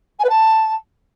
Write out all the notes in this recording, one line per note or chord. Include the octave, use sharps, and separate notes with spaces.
G#5
B4
A5